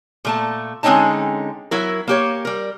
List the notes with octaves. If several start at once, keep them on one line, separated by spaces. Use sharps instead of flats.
A#2 A3 A5
D3 G#3 C4 C#4 D#4 A5
F#3 E4 A#4
A#3 G4 C#5
G3 A#4